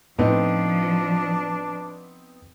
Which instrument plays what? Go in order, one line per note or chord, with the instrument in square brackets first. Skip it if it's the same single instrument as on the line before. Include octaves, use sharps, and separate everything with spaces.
[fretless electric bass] A2 [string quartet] F3 [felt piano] B3 C4 D#4 [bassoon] D4